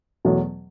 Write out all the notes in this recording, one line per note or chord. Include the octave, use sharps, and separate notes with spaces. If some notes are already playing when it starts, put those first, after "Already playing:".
E2 B2 F#3 A3